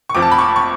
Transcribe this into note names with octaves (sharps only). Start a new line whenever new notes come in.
C#6
F1 F2 F3 D6
A5
B5
C#6
C#6